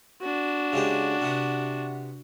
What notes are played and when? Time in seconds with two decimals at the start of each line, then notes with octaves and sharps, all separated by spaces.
0.22 D4 F#4
0.73 C#3 G#3 G4
1.21 C3 B3